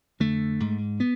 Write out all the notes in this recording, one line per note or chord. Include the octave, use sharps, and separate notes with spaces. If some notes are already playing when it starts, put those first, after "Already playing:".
F2 D3 A3
G#2
B3